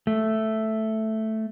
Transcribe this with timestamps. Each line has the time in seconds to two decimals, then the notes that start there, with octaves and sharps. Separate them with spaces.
0.07 A3